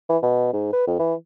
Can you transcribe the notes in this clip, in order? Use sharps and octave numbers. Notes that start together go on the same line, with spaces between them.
E3
B2
G#2
B4
F2
E3